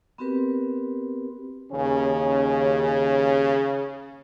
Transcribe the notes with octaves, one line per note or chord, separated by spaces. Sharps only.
B3 C4 F#4 G4 A#4 B4
D#2 C#3 C#4